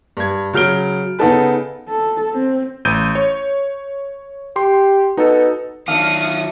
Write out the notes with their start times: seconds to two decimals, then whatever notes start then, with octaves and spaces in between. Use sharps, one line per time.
0.17 G2 G#6
0.53 C#3 F#3 F6 D7 G7
1.19 C#3 B3 D#4 G#4 A4 B4
1.89 A4
2.34 C4
2.85 A1 G6 D#7
3.15 C#5
4.56 G4 C6
5.17 B2 D#4 A4
5.88 D#3 F#3 D4 E5 F5 D#6